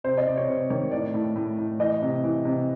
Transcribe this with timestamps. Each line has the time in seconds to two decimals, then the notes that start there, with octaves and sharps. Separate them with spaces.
0.04 C3 C5
0.18 D#5
0.27 C3 D5
0.37 C#5
0.48 C3 C5
0.70 D#3 C#5
0.91 A2 D5
1.14 A2
1.36 A2
1.58 A2
1.79 E3 D#5
2.02 C3
2.24 E3
2.45 C3